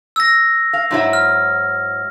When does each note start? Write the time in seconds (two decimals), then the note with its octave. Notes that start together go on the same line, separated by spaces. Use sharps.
0.16 E6 A#6
0.73 F5
0.91 G#2 F#3 E4
1.13 F6